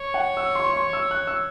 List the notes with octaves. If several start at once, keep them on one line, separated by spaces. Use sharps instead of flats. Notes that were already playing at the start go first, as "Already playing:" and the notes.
Already playing: C#5
F#5
E6
C6
C#6
C6
C#6
E6
F#6
E6